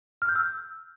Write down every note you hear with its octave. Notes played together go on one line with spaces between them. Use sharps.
F6
G6
E6